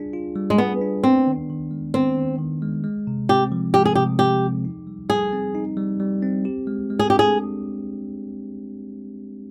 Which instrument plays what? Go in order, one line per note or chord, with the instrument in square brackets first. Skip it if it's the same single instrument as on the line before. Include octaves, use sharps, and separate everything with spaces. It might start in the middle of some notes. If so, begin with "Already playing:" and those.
Already playing: [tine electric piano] G3 D4 F4 G#4
F4
G3
[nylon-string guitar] G#3
[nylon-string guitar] B3 [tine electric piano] G#4
[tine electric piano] D4
[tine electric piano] B3 [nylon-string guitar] C4
[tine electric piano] D#3
D#3
G#3
[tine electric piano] B3 [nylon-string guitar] C4
[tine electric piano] D#3
D#3
G#3
G#3
C3
[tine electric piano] C4 [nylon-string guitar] G4
[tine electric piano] F3
[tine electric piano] G#3 [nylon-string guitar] G4
[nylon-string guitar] G#4
[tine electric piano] C3 [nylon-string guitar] G4
[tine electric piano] C4 [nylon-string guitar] G4
[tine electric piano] F3
D#4
G3
[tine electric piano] G3 [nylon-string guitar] G#4
[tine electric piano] C4
D#4
G3
G3
C4
G4
G#3
G#3
[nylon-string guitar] G#4
[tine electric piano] D4 [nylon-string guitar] G4
[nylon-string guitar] G#4